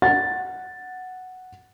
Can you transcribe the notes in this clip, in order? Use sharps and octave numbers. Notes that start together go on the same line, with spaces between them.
F#5 A6